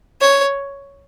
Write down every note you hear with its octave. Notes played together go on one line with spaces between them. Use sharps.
C#5